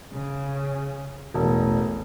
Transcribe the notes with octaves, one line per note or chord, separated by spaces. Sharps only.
C#3
E1 A1